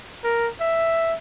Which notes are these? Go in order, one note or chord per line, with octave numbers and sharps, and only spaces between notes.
A#4
E5